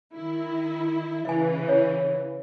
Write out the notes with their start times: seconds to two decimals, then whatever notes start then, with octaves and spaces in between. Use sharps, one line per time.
0.14 D#3 E4
1.25 C#3 E3 E5 G#5
1.68 C#5